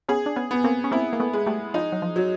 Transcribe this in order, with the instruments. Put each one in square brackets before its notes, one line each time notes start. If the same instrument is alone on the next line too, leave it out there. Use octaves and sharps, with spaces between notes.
[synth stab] B3 C#4 [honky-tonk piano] G#4
[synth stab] D4
B3 C#4
[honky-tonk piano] B3
[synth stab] A#3 C4
C#4
[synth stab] A#3 C4 [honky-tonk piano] E4
[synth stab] A#3
A3 B3
[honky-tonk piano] G#3
[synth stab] G3 A3
[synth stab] F3 [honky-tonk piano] D#4
[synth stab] F#3
F3
[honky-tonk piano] F#3